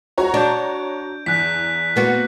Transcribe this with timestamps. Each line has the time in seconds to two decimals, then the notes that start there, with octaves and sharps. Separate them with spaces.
0.18 F#4 C#5 A#5
0.34 D4 G6 D7
1.26 E2 F#6 B6
1.96 A#3 B3 F#4